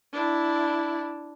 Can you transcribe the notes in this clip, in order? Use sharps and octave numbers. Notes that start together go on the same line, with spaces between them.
D4 E4